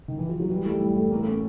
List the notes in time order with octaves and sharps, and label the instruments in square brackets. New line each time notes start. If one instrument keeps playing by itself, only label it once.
[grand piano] D#3
E3
F3
F#3
[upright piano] E3 [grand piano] G3
[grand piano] G3 [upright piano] A3
[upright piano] A2 [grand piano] G3
[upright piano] E3 [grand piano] A3
[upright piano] A2 [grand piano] A#3
[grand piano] A3
[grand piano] A#3 [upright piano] C#4